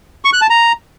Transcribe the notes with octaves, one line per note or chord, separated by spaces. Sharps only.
C#6
F#6
A5
A#5